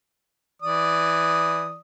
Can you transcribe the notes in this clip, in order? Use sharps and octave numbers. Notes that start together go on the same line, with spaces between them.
E3 D5 D#6